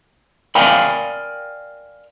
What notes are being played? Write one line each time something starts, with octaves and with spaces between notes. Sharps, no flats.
A#4 D5 F5 G5 G#5 B5